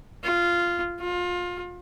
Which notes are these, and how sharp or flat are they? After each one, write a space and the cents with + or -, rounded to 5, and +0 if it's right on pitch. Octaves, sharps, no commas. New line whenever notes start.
F4 -10
F4 +25